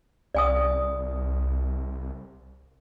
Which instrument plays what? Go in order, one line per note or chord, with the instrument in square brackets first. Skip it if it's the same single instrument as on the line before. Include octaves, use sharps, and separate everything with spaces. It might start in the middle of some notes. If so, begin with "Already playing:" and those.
[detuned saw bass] C2 [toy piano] D5 G#5 D#6